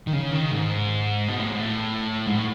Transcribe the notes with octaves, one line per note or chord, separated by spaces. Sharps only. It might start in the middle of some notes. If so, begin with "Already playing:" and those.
D#3
C#3
D#3
G#2
B2
A2
G#2
A2
G#2
A2